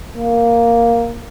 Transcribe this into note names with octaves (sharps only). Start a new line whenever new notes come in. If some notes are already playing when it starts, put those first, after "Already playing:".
A#3